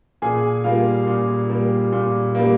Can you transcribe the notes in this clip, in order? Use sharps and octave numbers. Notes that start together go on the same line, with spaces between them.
A#2 G#4 G#5
G3 A#3 F4 F5
A#2
G3 A#3
A#2
G3 A#3